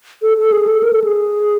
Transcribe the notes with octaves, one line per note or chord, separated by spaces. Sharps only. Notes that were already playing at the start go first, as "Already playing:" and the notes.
A4
A4
G#4
A4
A#4
A4
G#4